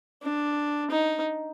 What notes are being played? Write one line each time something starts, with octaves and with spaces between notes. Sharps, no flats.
D4
D#4